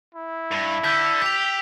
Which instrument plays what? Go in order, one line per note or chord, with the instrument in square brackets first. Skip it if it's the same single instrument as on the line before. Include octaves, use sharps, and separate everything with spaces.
[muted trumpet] E4
[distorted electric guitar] G2
[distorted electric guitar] D3 [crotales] E6 G6 B6
[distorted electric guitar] G4 [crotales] B6 F7